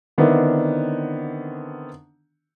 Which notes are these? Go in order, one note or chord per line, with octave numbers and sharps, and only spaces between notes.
D3 D#3 B3 C4 D4 E4